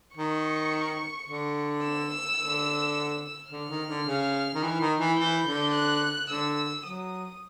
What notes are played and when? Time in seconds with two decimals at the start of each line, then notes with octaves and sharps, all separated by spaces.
0.16 D#3 C#6
1.28 D3
1.84 E6
2.40 D3
3.51 D3 F6
3.70 D#3
3.89 D3
4.07 C#3
4.55 D#3
4.63 E3
4.81 D#3
5.00 E3
5.18 E3 G6
5.47 D3
5.74 F#6
6.30 D3 E6
6.86 F#3 D#6